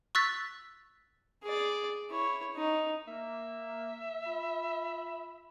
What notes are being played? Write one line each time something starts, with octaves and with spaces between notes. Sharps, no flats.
C#6 E6 F#6 A6 B6
G#4 D5
E4 C#5
D#4
A#3 E5
F4 B5